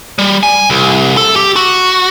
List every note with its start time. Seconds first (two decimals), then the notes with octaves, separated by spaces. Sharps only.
0.19 G3
0.43 G#5
0.70 C2
1.17 A4
1.36 G4
1.56 F#4